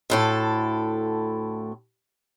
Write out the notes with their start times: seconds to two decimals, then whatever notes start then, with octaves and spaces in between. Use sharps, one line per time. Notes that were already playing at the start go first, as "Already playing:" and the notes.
0.10 D2 A2 A4